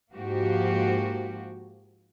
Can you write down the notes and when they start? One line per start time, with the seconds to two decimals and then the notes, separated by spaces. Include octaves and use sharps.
0.14 G#2 F3 A#3 F#4 G4